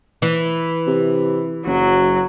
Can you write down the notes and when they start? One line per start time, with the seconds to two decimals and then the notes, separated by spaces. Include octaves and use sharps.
0.22 E3
0.87 C3
1.66 F#1 F#3